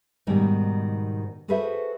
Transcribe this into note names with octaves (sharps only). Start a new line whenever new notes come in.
G#2 B2 D#3 G3
F#4 G#4 A4 B4 C5 E5